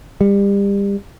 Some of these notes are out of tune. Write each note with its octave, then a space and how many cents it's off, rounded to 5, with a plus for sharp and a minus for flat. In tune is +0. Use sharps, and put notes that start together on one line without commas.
G3 +30